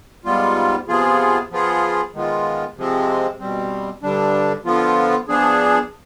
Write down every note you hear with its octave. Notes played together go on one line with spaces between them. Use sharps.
G#2 G3 B3 F4
C3 F3 B3 F4 G#4
F3 B3 F4 G#4
D#3 G#3 B3 F4
C3 F3 G#3 C4
B2 G3 C4
G2 D3 G3 D4
D3 F3 B3 F4
F3 B3 D4 G#4